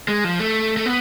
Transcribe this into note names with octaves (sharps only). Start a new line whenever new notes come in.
G#3
F3
A3
A3
B3